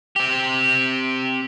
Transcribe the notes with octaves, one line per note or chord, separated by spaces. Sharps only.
C4 G4